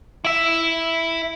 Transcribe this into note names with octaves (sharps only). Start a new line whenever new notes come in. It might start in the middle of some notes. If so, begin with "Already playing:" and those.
E4 E5